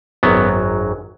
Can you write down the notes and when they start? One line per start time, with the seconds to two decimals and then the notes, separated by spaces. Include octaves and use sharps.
0.23 G#1 F#2 F#3 B3